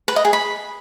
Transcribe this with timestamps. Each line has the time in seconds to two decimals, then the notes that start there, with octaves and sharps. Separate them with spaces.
0.08 B4
0.16 D#5
0.25 G#4
0.33 B5